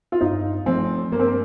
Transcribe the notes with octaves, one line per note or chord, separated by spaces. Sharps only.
F4
G2 D#4
F3 A3 C4
G2 A#3
C4
A#3